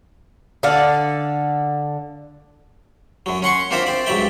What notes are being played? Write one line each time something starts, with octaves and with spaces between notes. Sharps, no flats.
D3 A4 D5 F5
F#2 F#3
C#4 F#5 C6 C#6
A#3 C4 D4 F4 E5 A#5
C4 D5
C#2 G2 F#3 D5 E5 G5